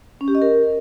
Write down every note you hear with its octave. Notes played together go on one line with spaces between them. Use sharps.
C#4
G4
D#5
A#4